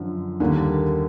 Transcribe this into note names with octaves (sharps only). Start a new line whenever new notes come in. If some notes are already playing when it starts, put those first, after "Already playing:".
Already playing: F#2 D3 F3
D#2 D3 G3 A#3